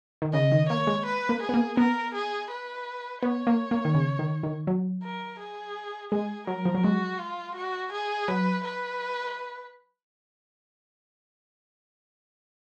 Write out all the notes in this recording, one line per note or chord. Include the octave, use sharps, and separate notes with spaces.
D#3
C#3 D#5
D#3
A#3 C#5
G#3
B4
A#3
G#4
B3
A#3
B3 A#4
G#4
B4
B3 C#5
A#3
A#3
D#3
C#3
D#3
D#3
F#3
A#4
G#4
G#3 G#4
F#3 A#4
F3
F#3
G#3 F#4
F4
F#4
G#4
F#3 B4
B4